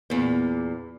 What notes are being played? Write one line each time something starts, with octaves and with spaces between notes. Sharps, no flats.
E2 A#2